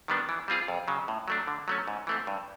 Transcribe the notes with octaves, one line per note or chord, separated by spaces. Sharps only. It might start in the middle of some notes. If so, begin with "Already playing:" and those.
D#3 G3 B3 D4
E3
G3 C4 F4 G#4
F2
C#3 F#3
A2
F#3 A3 D4
D3
F#3 A3 C#4
G#2
E3 A3 C4
G2